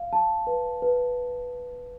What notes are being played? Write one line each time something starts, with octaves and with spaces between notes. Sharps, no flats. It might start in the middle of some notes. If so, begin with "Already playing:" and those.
Already playing: F5
A5
B4
B4